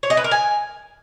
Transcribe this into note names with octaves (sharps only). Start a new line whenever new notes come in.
C#5
D#5
B4
A#4
G#5